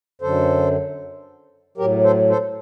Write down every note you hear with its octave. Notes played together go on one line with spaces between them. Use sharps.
F#2 D3 F#3 A4 C5
A2 F#3 G4 A#4
A4 C5
A4 C5